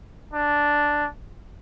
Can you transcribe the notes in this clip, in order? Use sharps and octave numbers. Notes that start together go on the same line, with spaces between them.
D4